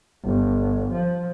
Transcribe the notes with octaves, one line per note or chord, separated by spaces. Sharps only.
G1
F3